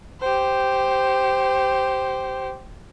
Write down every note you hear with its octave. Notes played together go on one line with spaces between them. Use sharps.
G4 C5